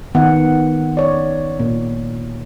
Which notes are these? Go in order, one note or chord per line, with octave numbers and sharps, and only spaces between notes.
D#3 B3 F#5
C#5 D5
A#2